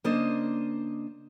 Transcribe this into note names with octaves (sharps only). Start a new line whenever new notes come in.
C#3 A#3 D4 C5 D#5